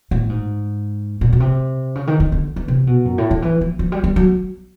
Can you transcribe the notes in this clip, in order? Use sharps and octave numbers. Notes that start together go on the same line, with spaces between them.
A2
G#2
A#2
B2
C3
C#3
D#3
D#3
D3
E3
C3
B2
F#2
A2
D#3
E3
F3
F3
G3
G3
F#3